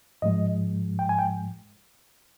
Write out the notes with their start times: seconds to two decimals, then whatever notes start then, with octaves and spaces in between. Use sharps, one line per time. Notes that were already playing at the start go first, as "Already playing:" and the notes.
0.22 G#2 F3 G#3 D#5
0.99 G5
1.09 G#5
1.19 G5